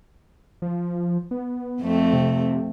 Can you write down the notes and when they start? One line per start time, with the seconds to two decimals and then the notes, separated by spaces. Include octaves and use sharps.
0.62 F3
1.31 B3
1.81 F2 A3 C4
2.13 C3